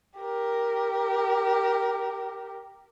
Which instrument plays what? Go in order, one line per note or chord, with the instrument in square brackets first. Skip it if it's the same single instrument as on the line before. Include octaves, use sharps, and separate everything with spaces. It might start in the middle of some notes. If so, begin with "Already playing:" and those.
[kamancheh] G4 A#4